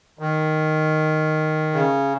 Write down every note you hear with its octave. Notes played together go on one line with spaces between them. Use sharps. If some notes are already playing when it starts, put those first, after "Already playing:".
D#3
C#3